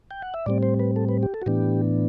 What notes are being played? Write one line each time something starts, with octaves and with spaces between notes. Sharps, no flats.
G5
F#5
E5
A2 G3 C4 D5
C5
B4
A4
B4
G4
A4
F#4
A2 E3 B3 D4 G4